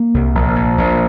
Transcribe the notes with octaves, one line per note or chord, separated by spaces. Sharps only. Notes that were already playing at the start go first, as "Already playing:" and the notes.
Already playing: A#3
C2
A#1
A#1
A#1